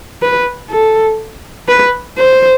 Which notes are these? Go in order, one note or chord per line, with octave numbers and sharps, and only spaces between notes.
B4
A4
B4
C5